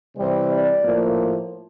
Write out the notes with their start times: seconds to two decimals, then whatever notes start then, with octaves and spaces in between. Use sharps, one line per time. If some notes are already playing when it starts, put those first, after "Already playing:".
0.17 C3 E3 G3 C4 C5
0.51 D5
0.84 A2 F3 A#3